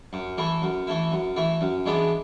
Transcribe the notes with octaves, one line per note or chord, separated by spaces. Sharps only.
F#2
E3 A3 E4
F#2
E3 A3 E4
F#2
E3 A3 E4
F#2
E3 G#3 B3 D4